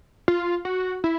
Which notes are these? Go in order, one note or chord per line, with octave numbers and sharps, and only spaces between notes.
F4
F#4
E4